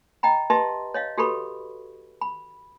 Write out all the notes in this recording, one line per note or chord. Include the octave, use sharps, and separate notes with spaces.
D#5 G5 A#5 B5
G4 B4 D#5 E5 A5 C6
C#5 D#5 F5
F#4 G4 A4 B4 B5 C#6
B5